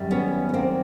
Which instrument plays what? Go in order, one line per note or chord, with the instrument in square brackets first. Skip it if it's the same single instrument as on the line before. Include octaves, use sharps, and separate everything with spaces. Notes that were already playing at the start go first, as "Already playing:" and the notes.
Already playing: [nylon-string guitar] F#2 D#3 G3
B3 C#4
B3
A#3 C4